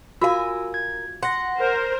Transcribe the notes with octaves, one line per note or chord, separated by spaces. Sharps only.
F4 F#4 A#4 F5 G#5 E6
G#6
F#5 C6 A#6
A#4 C5